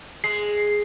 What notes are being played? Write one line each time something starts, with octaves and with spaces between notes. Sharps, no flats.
G#3 C7